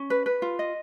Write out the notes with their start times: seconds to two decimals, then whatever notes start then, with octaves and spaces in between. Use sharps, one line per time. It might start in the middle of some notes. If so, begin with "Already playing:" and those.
Already playing: C#4
0.10 B4
0.26 B4
0.42 F4
0.59 D#5